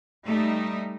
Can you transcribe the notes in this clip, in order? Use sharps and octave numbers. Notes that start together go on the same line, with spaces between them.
G3 A3 D#4